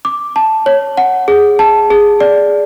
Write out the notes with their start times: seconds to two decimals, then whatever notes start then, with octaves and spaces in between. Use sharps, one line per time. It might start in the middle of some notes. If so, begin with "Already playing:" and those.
0.05 D6
0.36 A5
0.66 C#5
0.97 F#5
1.28 G#4
1.59 A5
1.90 G#4
2.20 D5